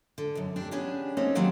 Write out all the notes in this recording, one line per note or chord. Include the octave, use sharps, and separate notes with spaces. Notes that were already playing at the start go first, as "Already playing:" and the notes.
D3
F#2 B2
C4 D4 G4
B3 C#4 D4 G4 G#4
A#3 C4 C#4 D#4
D#3 F#3 G3 A#3 C4